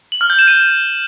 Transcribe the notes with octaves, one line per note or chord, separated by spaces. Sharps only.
F#7
F6
G6
E7
D#7